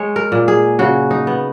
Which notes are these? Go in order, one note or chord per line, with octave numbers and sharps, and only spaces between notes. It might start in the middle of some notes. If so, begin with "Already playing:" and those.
Already playing: G#3 C#5
A#4
A#2
G#4
C#3 F#4
D#4
B3